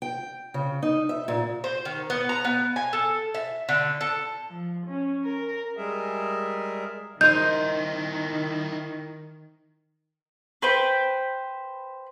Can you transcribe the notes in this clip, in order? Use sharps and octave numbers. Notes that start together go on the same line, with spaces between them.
G5
C#3
D#4
E5
A#2
C5
D#3
B3
A#5
B3
G#5
A4
E5
D3
A4
F3
C#4
A#4
G3 G#3 G#4 A#4 E5
D#3 D#4 E4 A#4 C5 G6
B4 C5 G5